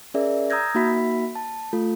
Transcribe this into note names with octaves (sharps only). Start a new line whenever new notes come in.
C#4 G#4 A#4 D5 E5
A#5 D#6 E6 G6 G#6 A#6
A#3 D#4 F#4 E5 B5 B6
A5
A3 F4 A4